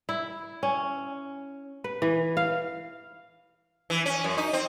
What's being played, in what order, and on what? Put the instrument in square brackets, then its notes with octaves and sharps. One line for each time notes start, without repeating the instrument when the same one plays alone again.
[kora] E4
C#4
B4
E3
F5
[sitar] E3
C#4
F#2
D#4
C4